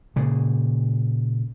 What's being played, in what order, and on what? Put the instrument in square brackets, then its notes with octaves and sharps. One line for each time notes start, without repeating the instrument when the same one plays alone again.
[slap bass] A#2 C#3